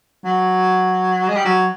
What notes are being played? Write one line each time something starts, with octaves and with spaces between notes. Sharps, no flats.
F#3
G#3
G3
F#3